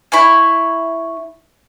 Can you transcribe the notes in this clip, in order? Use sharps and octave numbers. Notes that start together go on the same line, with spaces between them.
E4 C#5 G#5